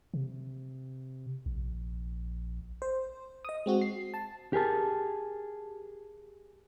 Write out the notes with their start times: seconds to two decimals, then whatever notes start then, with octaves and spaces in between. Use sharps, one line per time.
0.14 C3
1.46 A#1
2.82 C5
3.45 D#5 D#6
3.66 G#3 C4 F#4
3.82 C7
4.14 A5
4.53 G4 G#4 A#4 A5